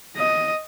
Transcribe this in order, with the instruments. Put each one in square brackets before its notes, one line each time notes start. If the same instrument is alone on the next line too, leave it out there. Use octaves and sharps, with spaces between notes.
[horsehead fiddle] D#5